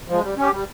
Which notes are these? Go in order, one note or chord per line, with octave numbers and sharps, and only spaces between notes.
F3 G#3
G3
C#4 G4
G3